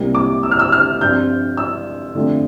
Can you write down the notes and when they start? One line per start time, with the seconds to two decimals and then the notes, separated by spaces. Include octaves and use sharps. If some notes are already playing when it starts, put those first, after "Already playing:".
Already playing: C2 C3 G3 A#3
0.15 D6
0.43 E6
0.51 F6
0.59 E6
0.72 F6
1.00 G2 F3 C4 G6
1.57 E6
2.15 F2 D3 F3 A3